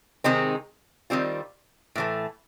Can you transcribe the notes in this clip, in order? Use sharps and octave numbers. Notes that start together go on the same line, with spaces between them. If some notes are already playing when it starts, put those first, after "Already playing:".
C3 D#3 G#3 C4 D#4
D#3 G3 C4 F4
A2 E3 A3